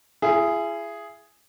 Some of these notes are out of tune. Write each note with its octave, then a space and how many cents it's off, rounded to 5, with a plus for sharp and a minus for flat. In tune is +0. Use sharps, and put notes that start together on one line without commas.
E4 +40 G#4 +0